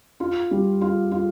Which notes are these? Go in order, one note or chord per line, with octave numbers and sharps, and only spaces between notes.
F4
G3
F4
F4